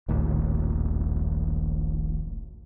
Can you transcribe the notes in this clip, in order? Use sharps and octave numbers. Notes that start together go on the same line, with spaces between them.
D#1 A#1 D#2 A2